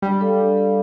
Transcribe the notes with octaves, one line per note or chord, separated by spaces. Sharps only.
G3 D4
A4 D5 F5
D4
A4 D5 F5